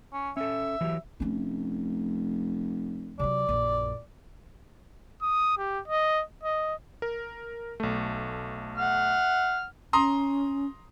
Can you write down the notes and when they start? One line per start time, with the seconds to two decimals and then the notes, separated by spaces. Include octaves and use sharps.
0.13 C#4
0.37 C#4 A4 E5
0.81 E3 F#3 G4
1.20 F1 A3 C#4
3.19 C3 F#3 D5
3.49 A#1 F#2
5.22 D#6
5.58 G4
5.88 D#5
6.44 D#5
7.02 A#4
7.80 B1 A3
8.78 F#5 F6
9.93 C#4 A#5 C6 D#6